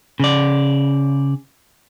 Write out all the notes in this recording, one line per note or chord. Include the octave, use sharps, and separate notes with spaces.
C#3 D5